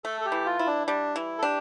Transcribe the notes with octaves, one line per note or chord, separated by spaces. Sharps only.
A3 A4
A4
G4
E3
F4
E4
D4
G3 D4
E3 E4
A4
D4 G4